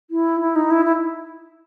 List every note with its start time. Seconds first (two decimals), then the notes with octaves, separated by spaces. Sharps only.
0.10 E4
0.40 E4
0.56 D#4
0.70 E4
0.85 E4